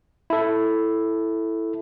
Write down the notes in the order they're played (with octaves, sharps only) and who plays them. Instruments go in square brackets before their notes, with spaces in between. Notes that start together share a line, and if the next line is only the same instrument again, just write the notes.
[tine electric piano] E4 A4